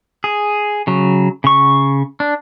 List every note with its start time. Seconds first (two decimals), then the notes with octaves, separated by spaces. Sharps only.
0.24 G#4
0.87 C#3 F#3
1.44 C#3 C#6
2.20 D4